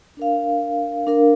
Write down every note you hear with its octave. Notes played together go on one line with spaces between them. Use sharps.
D4 A#4 F5
D4 A#4 F5